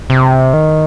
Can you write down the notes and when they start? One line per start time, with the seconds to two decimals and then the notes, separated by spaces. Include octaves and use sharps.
0.10 C3
0.53 D#3